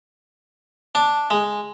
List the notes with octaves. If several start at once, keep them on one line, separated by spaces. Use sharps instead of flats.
D4
G#3